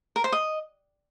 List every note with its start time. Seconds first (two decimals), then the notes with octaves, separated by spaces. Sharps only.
0.16 A#4
0.24 C5
0.32 D#5